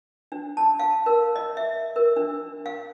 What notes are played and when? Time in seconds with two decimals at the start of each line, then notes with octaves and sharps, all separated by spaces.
0.32 D4
0.57 A5
0.79 F5
1.06 A#4
1.36 D#5
1.57 E5
1.96 A#4
2.16 D4
2.66 F5